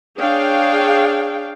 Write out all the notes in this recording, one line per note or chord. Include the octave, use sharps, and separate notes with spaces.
D4 G#4 C#5 F5 G5